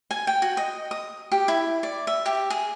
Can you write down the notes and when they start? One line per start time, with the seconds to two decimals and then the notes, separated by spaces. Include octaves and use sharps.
0.11 G#5
0.27 G5
0.42 F#4
0.57 D#5
0.91 D#6
1.32 G4
1.48 E4
1.83 D5
2.07 E5
2.26 G4
2.50 G#4